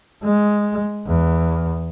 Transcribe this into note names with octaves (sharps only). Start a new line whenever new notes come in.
G#3
E2